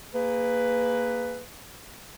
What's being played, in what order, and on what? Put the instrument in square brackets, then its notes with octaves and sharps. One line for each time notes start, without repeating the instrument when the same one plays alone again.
[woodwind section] A#3 G#4 B4